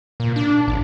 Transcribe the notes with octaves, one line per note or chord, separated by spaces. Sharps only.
A#2
D4
A1